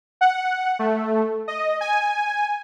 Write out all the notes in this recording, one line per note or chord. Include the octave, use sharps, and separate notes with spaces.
F#5
A3
D#5
G#5